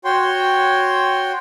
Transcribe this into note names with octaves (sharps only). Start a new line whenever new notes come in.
F#4 C#5 G5 C6